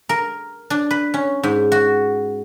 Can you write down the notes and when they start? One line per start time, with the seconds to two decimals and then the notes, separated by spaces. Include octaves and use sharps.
0.09 A#4
0.70 D4
0.91 B4
1.14 C#4
1.43 G#2
1.72 F#4